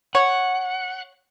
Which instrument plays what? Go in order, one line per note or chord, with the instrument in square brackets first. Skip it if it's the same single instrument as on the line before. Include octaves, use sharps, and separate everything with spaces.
[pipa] C#5 [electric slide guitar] F#5